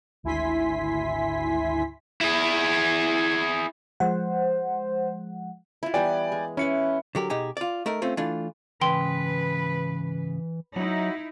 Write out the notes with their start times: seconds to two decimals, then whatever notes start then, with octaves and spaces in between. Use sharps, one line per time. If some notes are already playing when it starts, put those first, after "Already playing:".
0.23 G#1 D2 E4 G#5 C6 B6
2.21 E4 G#4
4.00 F3 G#3 C5 F#5
5.83 E4 F4
5.94 E3 G3 B3 D5 G5 G#5
6.32 G#3
6.57 C#4 E4 B4 C#7
7.15 D3 F#3 G4 A#4
7.30 B2 D#4 G4 G#4
7.57 F4 D5
7.86 A3 D#4 A#4
8.02 A3 C4 C#4 F4
8.17 E3 A3 D4 F4
8.81 G#2 C#3 E3 B4 G5 C6
10.76 F#3 D#4 E4 F#4